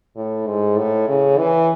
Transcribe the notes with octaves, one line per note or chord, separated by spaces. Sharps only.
A2
G#2
A2
C#3
E3